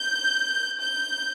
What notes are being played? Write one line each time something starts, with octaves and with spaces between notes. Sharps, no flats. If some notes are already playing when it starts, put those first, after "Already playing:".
Already playing: G6
G6